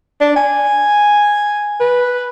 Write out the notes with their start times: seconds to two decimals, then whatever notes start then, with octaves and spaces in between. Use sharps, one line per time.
0.21 D4
0.36 G#5
1.80 B4